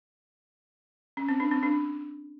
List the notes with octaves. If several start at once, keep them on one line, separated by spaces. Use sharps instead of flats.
C#4
C4
D4
C4
D4